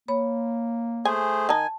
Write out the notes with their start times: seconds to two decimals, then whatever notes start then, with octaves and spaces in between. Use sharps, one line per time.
0.08 A#3 C#5 B5
1.05 A3 G#4 C5 G#5
1.49 D#3 D#4 G#5 A5